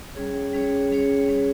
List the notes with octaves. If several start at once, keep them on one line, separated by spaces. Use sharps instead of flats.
G3 C#4 G#4 C#5
G3 C#4 G#4 C#5
G3 C#4 G#4 C#5
G3 C#4 G#4 C#5